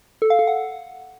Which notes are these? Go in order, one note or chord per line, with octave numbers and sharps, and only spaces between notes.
A4
F5
A4
F#5